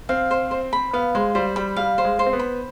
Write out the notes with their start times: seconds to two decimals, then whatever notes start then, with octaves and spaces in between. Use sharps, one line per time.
0.09 C4 F5
0.31 C5
0.51 C5
0.73 B5
0.93 B3 F5
1.15 G#3 C5
1.35 G3 C5
1.56 G3 B5
1.76 G3 F5
1.98 C5
2.05 G#3
2.19 C5
2.26 C4
2.33 B3
2.39 B5